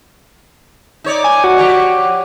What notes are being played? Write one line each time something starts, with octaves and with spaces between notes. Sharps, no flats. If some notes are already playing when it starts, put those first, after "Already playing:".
D#4 C#5 D5
G#5
F#4
F3 G4 C#5